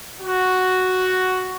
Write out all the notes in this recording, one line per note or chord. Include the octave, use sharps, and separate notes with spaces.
F#4